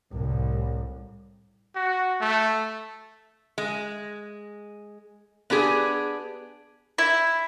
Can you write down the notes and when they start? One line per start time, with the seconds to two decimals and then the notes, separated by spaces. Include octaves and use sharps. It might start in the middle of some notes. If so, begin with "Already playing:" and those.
0.12 C2 A2
1.75 F#4
2.21 A3
3.58 G#3
5.50 B3 D4 G4 G#4
6.98 E4